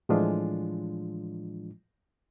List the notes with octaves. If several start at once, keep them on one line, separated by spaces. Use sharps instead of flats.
A2 E3 F3 G#3 D4 F4